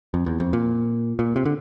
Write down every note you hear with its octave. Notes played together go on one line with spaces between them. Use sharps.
F2
E2
F2
A#2
A#2
C3
D3